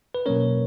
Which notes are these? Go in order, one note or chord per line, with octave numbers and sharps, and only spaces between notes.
B4
B2 F#3 A#3 C#4 A#4 C#5